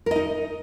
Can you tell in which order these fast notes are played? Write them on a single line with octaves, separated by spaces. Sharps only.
A#4 D#5 D#4